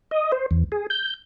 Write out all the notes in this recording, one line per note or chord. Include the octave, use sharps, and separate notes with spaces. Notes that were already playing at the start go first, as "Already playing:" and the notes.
D#5
C5
E2
G#4
G6